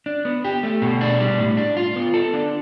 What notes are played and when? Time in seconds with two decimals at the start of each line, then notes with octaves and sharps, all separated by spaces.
0.06 D4
0.25 B3
0.44 G4
0.63 A3
0.82 B2
1.01 D4
1.20 G3
1.39 A2
1.57 D4
1.77 F4
1.96 B3
2.14 A4
2.34 D4